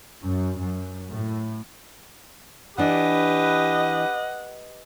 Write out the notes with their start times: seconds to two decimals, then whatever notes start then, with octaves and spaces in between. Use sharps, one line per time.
0.24 F#2
0.57 F#2
1.13 A2
2.78 E3 D4 G4 B4 D#5 F#5